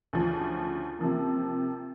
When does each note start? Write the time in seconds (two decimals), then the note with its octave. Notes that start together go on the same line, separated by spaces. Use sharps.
0.13 D2 C#3 F3
0.99 C3 F3 A#3